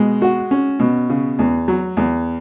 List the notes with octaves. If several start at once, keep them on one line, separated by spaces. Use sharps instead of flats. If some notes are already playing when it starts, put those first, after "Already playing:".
Already playing: B2 G#3
F#4
C#4
B2
C#3
E2
F#3
E2